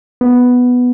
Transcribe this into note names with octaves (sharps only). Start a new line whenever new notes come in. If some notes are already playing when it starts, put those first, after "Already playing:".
B3